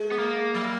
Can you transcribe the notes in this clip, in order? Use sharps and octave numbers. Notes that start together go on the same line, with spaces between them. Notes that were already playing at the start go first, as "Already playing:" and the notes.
Already playing: G#3
B3
A#3
F#3